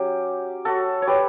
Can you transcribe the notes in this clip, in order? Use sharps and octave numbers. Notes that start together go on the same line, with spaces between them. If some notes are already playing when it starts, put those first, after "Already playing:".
Already playing: F#3 C#4 G4
F#4 A4
C#5
G4 B4